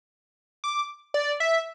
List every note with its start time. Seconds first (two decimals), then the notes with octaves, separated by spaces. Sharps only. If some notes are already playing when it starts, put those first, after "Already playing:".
0.64 D6
1.14 D5
1.40 E5